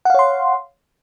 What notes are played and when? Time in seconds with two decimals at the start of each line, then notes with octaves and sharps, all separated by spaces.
0.05 F#5
0.10 F5
0.14 C#5
0.19 C6